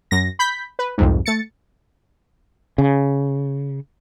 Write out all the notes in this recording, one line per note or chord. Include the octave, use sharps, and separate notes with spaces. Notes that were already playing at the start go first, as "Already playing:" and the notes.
F#2 A#6
B5 G6 B6
B4
C2 F2 G#2
A3 A6 C#7
C#3